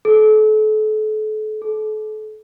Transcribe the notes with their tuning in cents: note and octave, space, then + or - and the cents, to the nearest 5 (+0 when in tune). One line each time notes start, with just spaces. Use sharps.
A4 -35
A4 -40